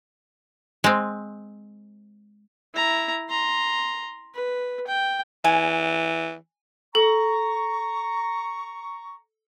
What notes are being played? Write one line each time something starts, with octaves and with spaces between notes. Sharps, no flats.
G#3 C4
E4 A#5
A#5 C6
B4
G5
E3 G#5
A4 A#5 C#6